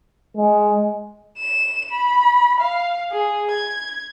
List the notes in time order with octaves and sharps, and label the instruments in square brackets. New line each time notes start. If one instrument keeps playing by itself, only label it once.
[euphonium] G#3
[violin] E7
B5
F5
G#4
G#6